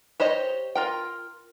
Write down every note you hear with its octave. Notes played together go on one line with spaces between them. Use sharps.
G4 C5 C#5 D#5
F4 A#4 G5